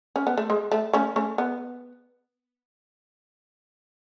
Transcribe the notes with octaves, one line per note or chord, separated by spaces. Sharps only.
C#4
B3
A3
G#3
A3
A3 C#4
A3 C#4
B3